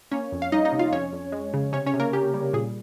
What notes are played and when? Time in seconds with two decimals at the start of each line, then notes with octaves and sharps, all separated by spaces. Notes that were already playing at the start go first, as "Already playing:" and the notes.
0.11 A#3 C#4 C#5
0.32 F2
0.42 F5
0.52 G3 D#4 D#5
0.65 D#4 D#5
0.72 C3
0.79 F4 F5
0.92 F2 C#4 C#5
1.13 F2
1.32 G#3
1.54 C#3
1.73 C3 C#4 C#5
1.86 C#4 C#5
1.94 C3
2.00 A#3 A#4
2.13 C#4 G4
2.34 G3
2.53 A#2 G#4